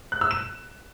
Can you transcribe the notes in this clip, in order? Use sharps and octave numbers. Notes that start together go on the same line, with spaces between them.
F#6
E6
E7